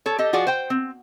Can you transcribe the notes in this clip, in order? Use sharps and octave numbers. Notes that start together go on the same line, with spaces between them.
A4 C#5
G4 A4 D#5
F3 F4 F#4 G#4 D5
C5 G5
C4